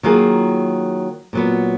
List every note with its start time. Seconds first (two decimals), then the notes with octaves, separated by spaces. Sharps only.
0.03 D#3 F#3 A#3 F4 G#4
1.33 A#2 F#3 B3